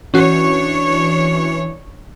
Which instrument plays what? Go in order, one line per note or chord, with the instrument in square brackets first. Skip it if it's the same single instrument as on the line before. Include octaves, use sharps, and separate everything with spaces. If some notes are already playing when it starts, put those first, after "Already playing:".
[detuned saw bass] E3 [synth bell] C#4 F#4 [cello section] D4 C#5